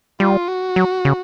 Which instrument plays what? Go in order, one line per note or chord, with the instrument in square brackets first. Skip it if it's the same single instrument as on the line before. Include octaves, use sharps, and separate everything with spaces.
[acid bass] G3 [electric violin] F4
[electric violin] F#4
[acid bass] F#3
C#3